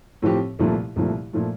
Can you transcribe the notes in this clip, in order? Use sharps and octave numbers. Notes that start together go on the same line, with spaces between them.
A2 F3 C4 G4
C2 A#2 F3 A3
C2 A#2 F3 A3
A#2 F3 A3